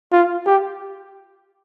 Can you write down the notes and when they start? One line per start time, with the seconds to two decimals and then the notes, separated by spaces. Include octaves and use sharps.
0.12 F4
0.46 G4